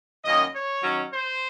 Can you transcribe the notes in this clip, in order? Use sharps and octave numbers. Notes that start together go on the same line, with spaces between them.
F#2 D#3 A#3 C#4 D#5
C#5
D#3 F#3 C#4
C5